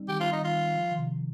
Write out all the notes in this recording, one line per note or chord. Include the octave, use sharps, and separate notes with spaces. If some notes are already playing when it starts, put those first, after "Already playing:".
Already playing: G3 C4 D#4
D#3 G4
F4
D#4
D#3 F4
F3
D#3
C3